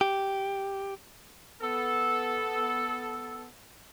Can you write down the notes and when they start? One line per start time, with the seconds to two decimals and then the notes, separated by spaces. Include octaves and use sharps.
0.01 G4
1.62 B3 A4